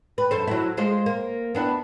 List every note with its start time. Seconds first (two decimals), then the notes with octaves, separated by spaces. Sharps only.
0.18 B4
0.31 F#2 A4 C5
0.47 F#3 E4
0.77 G#3 F4 C5
1.06 A#3
1.55 B3 D4 E4